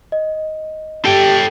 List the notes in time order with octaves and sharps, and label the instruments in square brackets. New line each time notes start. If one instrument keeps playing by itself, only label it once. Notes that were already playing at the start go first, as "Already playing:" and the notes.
[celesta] D#5
[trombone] G4 [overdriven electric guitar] A4 G5